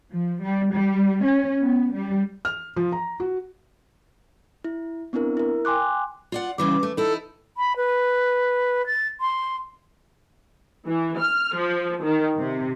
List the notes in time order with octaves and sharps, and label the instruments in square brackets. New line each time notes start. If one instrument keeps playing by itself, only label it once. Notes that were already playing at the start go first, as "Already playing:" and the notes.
[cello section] F3
G3
G3
C#4
B3
G3
[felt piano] F6
F3
A#5
F#4
[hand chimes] E4
B3 C4 D4 E4 A#4
E4 A#4
G5 G#5 C6 D6 F#6
[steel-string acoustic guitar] F4 D5 F#5
[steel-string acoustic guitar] C#3 E3 G3 [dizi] D6
[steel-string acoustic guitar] A3
[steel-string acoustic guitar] D#4 E4 [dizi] A4
[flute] B5
B4
A6
C6
[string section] E3
F6
F3
D#3
C3